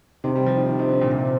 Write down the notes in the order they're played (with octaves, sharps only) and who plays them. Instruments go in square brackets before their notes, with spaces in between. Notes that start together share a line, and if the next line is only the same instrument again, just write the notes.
[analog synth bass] C3 [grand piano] D#3
[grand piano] G3
F3
D#3
D#3
D#3
D3
A#2
A#2